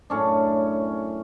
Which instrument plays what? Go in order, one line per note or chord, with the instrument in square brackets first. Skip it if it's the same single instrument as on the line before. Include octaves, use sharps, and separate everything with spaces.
[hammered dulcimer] F#2 A2 C#4 D4